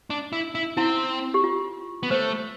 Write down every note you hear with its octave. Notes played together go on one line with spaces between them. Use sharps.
D4
E4
E4
C4 E4
G4
F4
B3
A3 C5